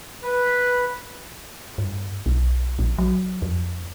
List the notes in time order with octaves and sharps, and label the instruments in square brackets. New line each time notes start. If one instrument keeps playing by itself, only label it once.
[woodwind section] B4
[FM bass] G2
B1
A#1
F#3
F2